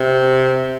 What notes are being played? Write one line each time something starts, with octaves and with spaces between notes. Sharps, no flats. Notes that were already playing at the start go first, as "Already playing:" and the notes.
Already playing: C3